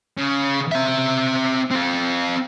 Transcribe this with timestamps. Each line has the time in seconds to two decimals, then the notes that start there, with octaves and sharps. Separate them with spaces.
0.18 C#3
0.72 C4 E5
1.71 C4 F4